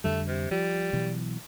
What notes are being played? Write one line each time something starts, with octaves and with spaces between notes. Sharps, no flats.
F2 D3 G3 A3
C3
F3 G3
B2 E3 F#3